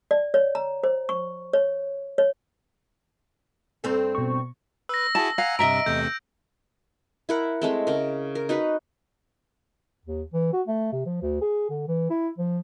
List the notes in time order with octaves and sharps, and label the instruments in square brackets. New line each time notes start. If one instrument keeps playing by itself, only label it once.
[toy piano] D5
C#5
A#5
C5
C#6
C#5
C#5
[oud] G2 C4 A4
[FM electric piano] B2 C#6
[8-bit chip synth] B4 [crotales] E6 A#6
[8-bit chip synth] E4 F#4 G#4 [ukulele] A5
[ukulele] F5 [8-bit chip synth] F#5 G#5 A#5
[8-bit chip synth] G2 C3 [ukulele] D#5 E5 A#5 [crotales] D7
[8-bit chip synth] E2 C3 A3 [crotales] G6
[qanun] E4 A#4 F#5
G#3 A3 C4
C#3 A#4
A#4
D#4 F#4 B4
[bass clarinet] D#2
E3
F#4
A3
C3
F3
D2
G#4
D3
E3
E4
F3